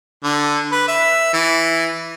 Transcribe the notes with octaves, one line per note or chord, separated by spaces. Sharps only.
D3
B4
E5
E3